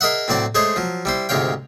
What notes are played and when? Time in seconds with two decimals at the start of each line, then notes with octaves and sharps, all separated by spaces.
0.01 G#4 A#4 D#5 E5 F#5
0.28 A2 F#3 C4 D5 A5
0.55 G#3 A3 G#4 C5 C#5 D#5
0.76 F3 F#3
1.05 G3 E4 C5
1.29 D2 G#2 C3 C#5 F5 G5